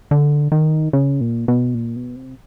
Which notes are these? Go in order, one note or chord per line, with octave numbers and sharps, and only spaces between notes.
D3
D#3
C#3
A#2
B2
A#2
B2
C3